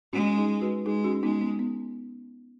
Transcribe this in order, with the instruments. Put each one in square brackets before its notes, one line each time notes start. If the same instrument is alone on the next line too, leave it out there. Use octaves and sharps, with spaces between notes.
[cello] G#3 [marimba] C#4 F#4
[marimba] D#4 G#4
F#4 B4
[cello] G#3 [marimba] D#4 G#4
[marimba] C#4 F#4
[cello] G#3 [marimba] B3 D#4
[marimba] B3
B3